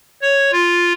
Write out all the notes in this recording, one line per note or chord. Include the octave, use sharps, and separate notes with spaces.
C#5
F4